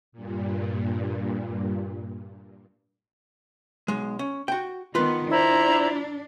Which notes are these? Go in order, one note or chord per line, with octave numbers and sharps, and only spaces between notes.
G2 A#2
B1 G#3
C#4
F#4 G5
D#3 B3 F4 B4
D4 E4 C5 A#5